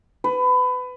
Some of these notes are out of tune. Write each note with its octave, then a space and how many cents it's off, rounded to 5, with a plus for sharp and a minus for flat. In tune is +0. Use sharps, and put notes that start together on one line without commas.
B4 +25